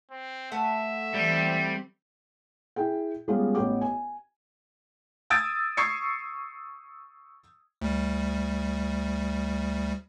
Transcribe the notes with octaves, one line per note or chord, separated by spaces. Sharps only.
C4
A3 B4 E5 F#5
E3 G3 C4
E4 G#4 G5
G3 G#3 B3 C#4 F4 G4
A1 B3 G4 C#5 G5 D6
G#5
D#6 E6 G#6 A6 D7
C#6 D#6 E6 G#6 C7 C#7
D2 G3